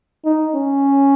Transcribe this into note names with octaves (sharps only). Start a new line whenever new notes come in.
D#4
C#4